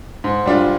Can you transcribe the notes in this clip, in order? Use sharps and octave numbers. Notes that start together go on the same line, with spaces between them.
G#2
G3 D4 F4